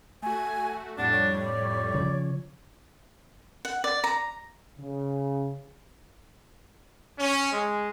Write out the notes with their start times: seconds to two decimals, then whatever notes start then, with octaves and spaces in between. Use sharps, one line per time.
0.23 A3 F#4 G#5
0.98 F2 A2 G3 D4 F#5
1.12 C#5
1.45 D5
1.94 C#3 F3
3.65 F#5
3.84 D5
4.04 A#5
4.78 C#3
7.19 C#4
7.52 G#3